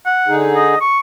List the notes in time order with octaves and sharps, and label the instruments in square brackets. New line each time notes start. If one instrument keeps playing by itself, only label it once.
[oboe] F#5
[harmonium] D3 D#4 G#4
[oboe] D#5
C#6